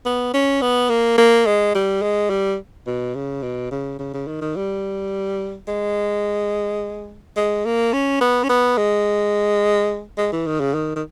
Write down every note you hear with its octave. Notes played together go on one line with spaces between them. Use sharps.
B3
C#4
B3
A#3
A#3
G#3
G3
G#3
G3
B2
C#3
B2
C#3
C#3
C#3
D#3
D#3
G3
G#3
G#3
A#3
C#4
B3
C#4
B3
G#3
G#3
E3
D#3
C#3
D#3
D#3